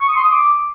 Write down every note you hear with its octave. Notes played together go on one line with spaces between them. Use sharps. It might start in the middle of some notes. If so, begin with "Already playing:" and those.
C#6
D#6
C6
D#6
D6